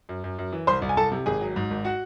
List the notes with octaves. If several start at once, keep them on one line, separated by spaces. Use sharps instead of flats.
F#2
F#2
F#2
E3
C2 C5 C6
C2
G#5
C2 A4 A5
C3
G#1 G#4 G#5
F#3
G#2
G#1
F#4 F#5